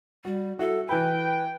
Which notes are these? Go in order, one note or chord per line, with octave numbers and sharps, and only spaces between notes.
G3 F#4
E4 F#4 A4
E3 B4 G5 B5